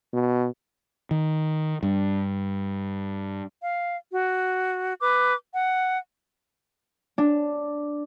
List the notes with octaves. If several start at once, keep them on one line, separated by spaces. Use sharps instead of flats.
B2
D#3
G2
F5
F#4
B4 D6
F#5
D4